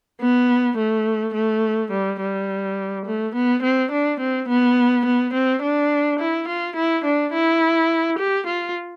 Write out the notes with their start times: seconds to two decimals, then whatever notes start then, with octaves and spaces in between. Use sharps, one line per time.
0.21 B3
0.78 A3
1.35 A3
1.92 G3
2.21 G3
3.06 A3
3.35 B3
3.63 C4
3.92 D4
4.20 C4
4.49 B3
5.06 B3
5.34 C4
5.62 D4
6.20 E4
6.48 F4
6.76 E4
7.05 D4
7.33 E4
8.19 G4
8.47 F4